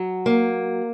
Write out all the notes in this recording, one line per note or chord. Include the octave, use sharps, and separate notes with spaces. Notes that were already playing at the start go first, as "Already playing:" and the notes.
Already playing: F#3
A#3